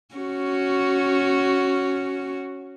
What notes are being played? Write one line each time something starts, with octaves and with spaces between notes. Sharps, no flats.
C#4 F#4